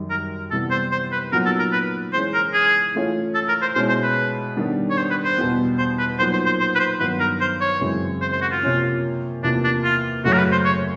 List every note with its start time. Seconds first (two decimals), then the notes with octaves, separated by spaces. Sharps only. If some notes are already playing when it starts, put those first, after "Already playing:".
Already playing: F#2 D#3 G3
0.10 A#4
0.51 C3 E3 G3 B3 A4
0.71 C5
0.92 C5
1.12 B4
1.32 A#2 F#3 B3 D#4 F#4 A#4
1.46 A4
1.59 A#4
1.73 B4
2.13 E3 G#3 C#4 C5
2.34 A#4
2.54 G#4
2.94 E3 A3 C#4 F4
3.35 A4
3.49 A#4
3.62 C5
3.75 B2 G#3 C#4 E4 C5
3.89 C5
4.03 B4
4.56 D#3 G3 B3 D4
4.90 C#5
4.97 C5
5.11 B4
5.24 C5
5.38 E2 B2 G3 B3
5.78 C5
5.99 B4
6.19 A#2 F#3 B3 D#4 C5
6.33 C5
6.46 C5
6.60 C5
6.75 B4
6.79 C5
7.00 G2 D#3 F#3 B3 B4
7.20 A#4
7.41 C5
7.61 C#5
7.81 F#2 C#3 E3 G#3 C4
8.22 C5
8.32 C5
8.42 F#4
8.52 F4
8.63 C3 F3 A#3 C#4
9.43 E2 C3 F3 A#3 D4
9.64 D4
9.84 F4
10.24 F#2 C#3 F#3 A3 C#4 F#4
10.33 A#4
10.38 B4
10.52 C5
10.65 C#5